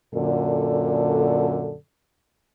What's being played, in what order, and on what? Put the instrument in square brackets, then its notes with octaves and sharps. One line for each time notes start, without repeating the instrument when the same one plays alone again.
[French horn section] F#2 A#2 D3 A4